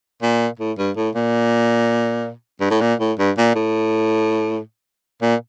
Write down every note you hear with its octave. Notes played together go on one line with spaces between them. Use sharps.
A#2
A2
G2
A2
A#2
G2
A2
A#2
A2
G2
A#2
A2
A#2